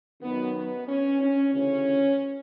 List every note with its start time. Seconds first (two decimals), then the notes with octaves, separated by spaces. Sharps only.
0.23 F#2 D#3 F#3 B3
0.55 B3
0.89 C#4
1.22 C#4
1.54 D2 C#3 E3 C#4